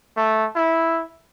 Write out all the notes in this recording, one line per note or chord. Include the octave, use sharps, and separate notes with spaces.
A3
E4